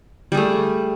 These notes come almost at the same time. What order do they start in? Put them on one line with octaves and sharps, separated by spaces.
G3 G#4 A3